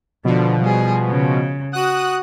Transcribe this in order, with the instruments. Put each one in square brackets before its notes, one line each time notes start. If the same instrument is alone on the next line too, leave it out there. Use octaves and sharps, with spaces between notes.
[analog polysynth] B2 F3 [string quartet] D3
[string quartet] G3 G#4
C#3
[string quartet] F#4 [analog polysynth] D#6 F#6